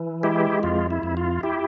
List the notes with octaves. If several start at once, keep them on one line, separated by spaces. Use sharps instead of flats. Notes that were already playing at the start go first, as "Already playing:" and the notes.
Already playing: E3
G#3 E4 G4
F2 F4
E4
F2
F4
E4 G4